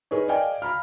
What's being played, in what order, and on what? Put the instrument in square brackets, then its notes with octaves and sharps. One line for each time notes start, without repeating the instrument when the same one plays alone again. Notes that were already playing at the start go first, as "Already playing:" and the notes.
[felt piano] D#4 G#4 A#4 B4 C#5
D5 D#5 F5 G5 G#5
F5 A#5 B5 F6